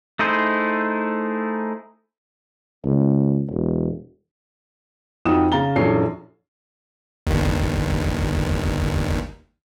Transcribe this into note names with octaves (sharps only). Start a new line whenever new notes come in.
A3 D#4 E4 G#4 C5
C#2
E1
F2 D#4 F#4 G5 D#6 E7
C#3 F5 A#5 A6 G7
A#1 F#2 E3 A4 C#5 C7
G1 D#2